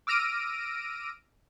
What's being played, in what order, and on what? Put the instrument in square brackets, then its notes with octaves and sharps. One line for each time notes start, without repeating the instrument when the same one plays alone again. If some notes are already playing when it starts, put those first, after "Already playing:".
[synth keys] D6 E6 F6 A#6 D7 D#7